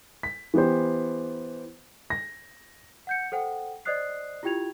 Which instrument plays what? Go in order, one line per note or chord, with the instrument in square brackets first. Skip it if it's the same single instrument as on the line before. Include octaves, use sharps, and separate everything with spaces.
[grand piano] B6
E3 B3 G4 C5
A#6
[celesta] F#5 G6 C#7
A4 C5 F#5 G5
C5 D5 D#5 D#6 F#6 C7
E4 F4 G4 G5 G#6 F7